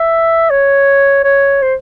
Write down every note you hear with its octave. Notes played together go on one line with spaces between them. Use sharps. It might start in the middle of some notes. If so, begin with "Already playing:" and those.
Already playing: E5
C#5
C#5
C5